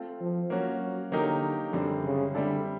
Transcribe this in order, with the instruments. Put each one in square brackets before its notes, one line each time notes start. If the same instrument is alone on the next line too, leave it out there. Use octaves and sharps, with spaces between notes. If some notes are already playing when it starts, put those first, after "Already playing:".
Already playing: [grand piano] A3 C4 F4
[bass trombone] F3
[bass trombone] F#3 [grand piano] A#3 C#4 F#4
[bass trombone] F#3
[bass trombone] D3 [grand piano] F#3 A#3 D#4 G4 A#4
[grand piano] F#2 D3 G3 C4
[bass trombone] C#3
[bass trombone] D3 [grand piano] G3 C4 E4 A4 D5